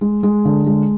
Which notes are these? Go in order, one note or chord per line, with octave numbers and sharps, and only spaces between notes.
G#3
G#3
D3
G#3